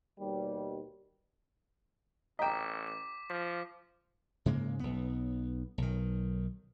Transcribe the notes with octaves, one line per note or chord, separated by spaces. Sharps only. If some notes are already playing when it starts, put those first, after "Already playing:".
D#2 B2 G3
A1 D#5 G5 A#5 D6 B6
D6
F3 B6
G#2 C#3 G#3 A#3
B1 B3
B1 D#3